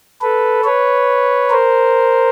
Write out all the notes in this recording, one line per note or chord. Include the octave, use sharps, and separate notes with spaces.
A4 B4
B4 C#5
A#4 C5